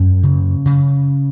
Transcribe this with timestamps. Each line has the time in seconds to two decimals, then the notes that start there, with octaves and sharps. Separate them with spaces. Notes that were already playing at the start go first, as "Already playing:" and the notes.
Already playing: F#2 C#4
0.23 C#3
0.66 C#3